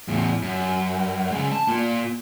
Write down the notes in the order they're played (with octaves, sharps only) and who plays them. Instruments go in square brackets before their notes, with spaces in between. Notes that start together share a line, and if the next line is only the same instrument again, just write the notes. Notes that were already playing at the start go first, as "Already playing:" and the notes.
[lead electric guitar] E2 A2
F#2
C#3 G#3
A5
A#3 F4